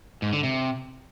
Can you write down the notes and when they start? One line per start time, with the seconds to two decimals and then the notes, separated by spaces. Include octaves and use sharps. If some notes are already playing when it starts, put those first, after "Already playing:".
0.22 G#2
0.33 D3
0.43 C3